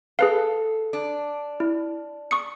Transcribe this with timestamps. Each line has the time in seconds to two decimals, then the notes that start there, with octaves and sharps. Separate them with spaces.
0.19 G#4 A4 B4 F5
0.93 D4
1.60 E4
2.31 C#6 D#6 C#7